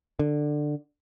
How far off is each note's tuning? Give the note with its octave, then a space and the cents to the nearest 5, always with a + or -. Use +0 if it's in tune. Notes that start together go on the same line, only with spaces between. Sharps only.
D3 +15